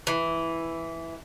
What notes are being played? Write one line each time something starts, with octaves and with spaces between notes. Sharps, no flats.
E3